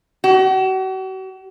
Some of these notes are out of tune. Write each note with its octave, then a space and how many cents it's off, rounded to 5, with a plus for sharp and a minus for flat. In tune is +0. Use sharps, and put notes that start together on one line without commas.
F#4 +40